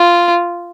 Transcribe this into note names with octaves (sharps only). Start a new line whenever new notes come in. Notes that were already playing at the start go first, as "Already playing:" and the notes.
Already playing: F4